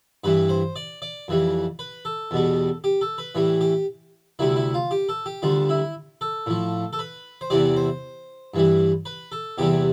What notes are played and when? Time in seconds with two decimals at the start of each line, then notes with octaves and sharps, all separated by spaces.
0.24 G2 E3 G3 B4
0.49 C5
0.76 D5
1.02 D5
1.28 F2 E3 G3
1.79 B4
2.05 A4
2.31 E2 B2 G3
2.84 G4
3.01 A4
3.18 B4
3.35 A2 E3 G3
3.61 G4
4.39 D2 C3 G3 E4
4.56 E4
4.74 F4
4.91 G4
5.09 A4
5.26 G4
5.42 D2 D3 G3 F4
5.69 E4
6.21 A4
6.46 A2 F3
6.93 A4
6.99 B4
7.41 C5
7.50 E2 C3 E3 G3 D5
7.76 C5
8.54 G2 E3 G3
9.06 B4
9.32 A4
9.58 E2 C3 E3 G3 G4